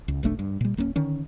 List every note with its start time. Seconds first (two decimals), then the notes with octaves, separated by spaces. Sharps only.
0.08 C#2
0.23 F1 B1 A3 D4
0.39 G2
0.61 A#2 G3
0.77 D1 A#3 C4 C#4
0.96 D3 D#3 C#4